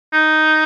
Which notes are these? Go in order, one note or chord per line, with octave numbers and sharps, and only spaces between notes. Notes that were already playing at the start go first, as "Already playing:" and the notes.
D#4